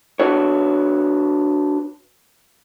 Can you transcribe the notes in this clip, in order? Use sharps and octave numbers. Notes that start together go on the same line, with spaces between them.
D4 F#4 B4 C#5